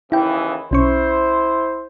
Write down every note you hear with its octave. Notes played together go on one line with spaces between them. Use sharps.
D#2 C#3 E3 E4 G5
B1 C#4 E4 C5 C#6